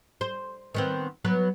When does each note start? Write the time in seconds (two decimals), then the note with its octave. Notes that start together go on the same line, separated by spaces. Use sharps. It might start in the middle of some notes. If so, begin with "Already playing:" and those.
0.21 C5
0.74 D#3 B3 C4
1.25 F#3 B3 B4